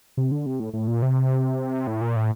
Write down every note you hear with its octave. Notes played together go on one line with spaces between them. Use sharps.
C3
D3
C3
A2
A2
A#2
C3
A2
A#2
A2